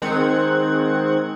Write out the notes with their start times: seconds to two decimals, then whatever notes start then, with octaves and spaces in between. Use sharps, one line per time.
0.02 D#3 G#3 C4 F#5 G#6